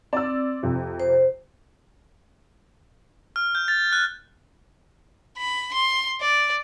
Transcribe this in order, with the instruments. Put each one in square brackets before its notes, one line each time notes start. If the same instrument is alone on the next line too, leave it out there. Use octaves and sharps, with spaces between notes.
[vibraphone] C4 [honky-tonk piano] D5 E6
[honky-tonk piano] F2 C3
[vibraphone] C5
[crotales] F6
G6
A6
F#6
[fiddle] B5
C6
D5